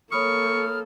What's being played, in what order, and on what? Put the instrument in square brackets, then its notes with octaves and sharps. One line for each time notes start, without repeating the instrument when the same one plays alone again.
[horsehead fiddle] A#3 A4 [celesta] C#5 B5 D#6 [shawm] C#6 [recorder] F6